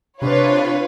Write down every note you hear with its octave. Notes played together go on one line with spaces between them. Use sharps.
C3 D4 F4 B4 C#5